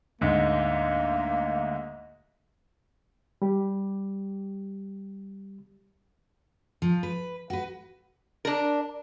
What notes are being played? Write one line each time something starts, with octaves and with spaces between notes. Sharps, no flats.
D2 G#2 A#3
G3 G4
F3
B4
F#4 B4
D4 A#4